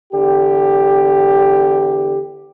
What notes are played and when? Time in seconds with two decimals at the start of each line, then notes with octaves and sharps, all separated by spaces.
0.13 E2 D3 G4